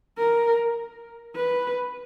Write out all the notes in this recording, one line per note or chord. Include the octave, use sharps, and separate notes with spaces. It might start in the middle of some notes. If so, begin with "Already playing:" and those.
A#4
B4